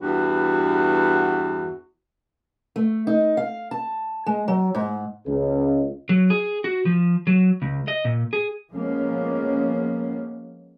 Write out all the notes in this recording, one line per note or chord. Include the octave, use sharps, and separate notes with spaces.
E2 G2 F#4
A3
D#4
F5
A5
G#3
F#3
G#2
C#2
F#3
G#4
F#4
F3
F#3
C#2
D#5
A#2
G#4
F3 G#3 A#3 B3 C#4